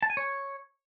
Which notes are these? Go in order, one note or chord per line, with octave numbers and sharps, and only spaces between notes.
A5
G#5
C#5